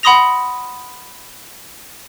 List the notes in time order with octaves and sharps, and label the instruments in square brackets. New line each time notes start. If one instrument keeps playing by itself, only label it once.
[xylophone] F#5 B5 C6 D#6 A#6 F7